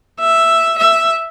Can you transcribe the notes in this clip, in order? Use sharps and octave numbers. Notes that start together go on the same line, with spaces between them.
E5
E5